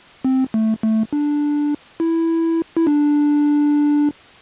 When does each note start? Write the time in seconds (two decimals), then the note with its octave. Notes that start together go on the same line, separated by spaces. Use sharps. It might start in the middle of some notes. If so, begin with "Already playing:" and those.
0.25 C4
0.54 A3
0.83 A3
1.13 D4
2.00 E4
2.77 E4
2.87 D4